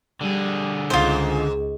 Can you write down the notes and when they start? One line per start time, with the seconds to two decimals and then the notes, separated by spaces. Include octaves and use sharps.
0.21 D3 G3 G#4
0.90 C#2 G#2 F4 C5